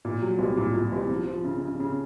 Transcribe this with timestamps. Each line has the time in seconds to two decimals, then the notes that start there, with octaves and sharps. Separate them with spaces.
0.05 A#2
0.22 F#3
0.39 C2
0.57 A#2
0.74 A#2
0.92 C2
1.09 F3
1.27 F3
1.44 C#3
1.62 C#3
1.80 C#3